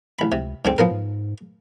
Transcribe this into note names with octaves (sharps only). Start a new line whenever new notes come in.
A1 B5
C#2 C3
C#2 G#2 D3 C4
A2 F3 B3 A#4
G#2